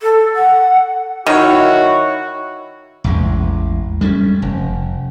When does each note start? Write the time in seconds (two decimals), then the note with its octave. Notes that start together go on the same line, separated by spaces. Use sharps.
0.02 A4
0.35 F#5
1.27 D#3 D#4 E4 F#4 C#5
3.04 A1 E2 G#3
4.01 G3 A3 B3 C#4
4.42 F1